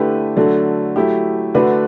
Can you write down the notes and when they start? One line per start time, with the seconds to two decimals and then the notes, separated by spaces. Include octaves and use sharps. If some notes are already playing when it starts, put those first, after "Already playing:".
Already playing: D3 A3 E4 G4 B4
0.37 D3 F#3 A3
0.96 F#3 A3 E4 G4
1.55 D3 A3 D4 F#4 B4